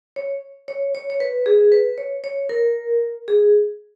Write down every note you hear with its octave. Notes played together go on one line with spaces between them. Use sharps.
C#5
C#5
C#5
C#5
B4
G#4
B4
C#5
C#5
A#4
G#4